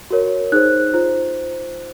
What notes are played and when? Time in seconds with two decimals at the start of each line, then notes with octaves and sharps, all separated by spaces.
0.11 F#4 A#4 C#5
0.52 D#4 G#4 C5 F#6
0.94 F4 C5